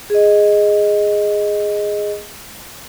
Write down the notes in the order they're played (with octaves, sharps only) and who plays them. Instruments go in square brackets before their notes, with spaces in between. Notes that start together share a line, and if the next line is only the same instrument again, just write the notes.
[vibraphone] G#4 D#5